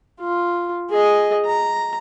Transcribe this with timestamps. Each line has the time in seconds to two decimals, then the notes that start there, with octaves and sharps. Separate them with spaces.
0.21 F4
0.90 G#4 D#5
1.46 A#5